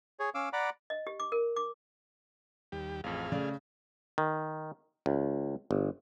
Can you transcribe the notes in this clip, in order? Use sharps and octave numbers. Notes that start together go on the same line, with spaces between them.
G#4 C#5
C#4 F5 D6 E6
D5 F#5 A#5 B5 D6
D#5
G4
D6
A#4
D6
D#2 G3 G4
A1 F2 G#4 F5
C#3 A3 D5
D#3
C#2
G1